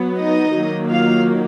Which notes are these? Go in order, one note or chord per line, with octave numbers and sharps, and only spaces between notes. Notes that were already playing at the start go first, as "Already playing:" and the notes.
Already playing: F#3 B3
D#4 D#5
D#3 F#3 A#3
F4 F5